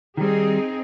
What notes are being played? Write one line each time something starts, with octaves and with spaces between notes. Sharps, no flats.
D#3 G3 C4 D#4 G#4